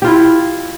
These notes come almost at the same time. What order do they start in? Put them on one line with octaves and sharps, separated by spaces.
G4 F4 E4